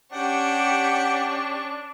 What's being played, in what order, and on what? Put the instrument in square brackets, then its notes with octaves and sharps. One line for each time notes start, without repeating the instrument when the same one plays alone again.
[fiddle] C#4 C#6 [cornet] D4 [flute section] G4 [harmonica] F#5 G5